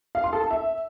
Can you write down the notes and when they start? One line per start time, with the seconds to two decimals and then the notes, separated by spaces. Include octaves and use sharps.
0.15 F5
0.24 C6
0.33 A4
0.42 A5
0.51 E5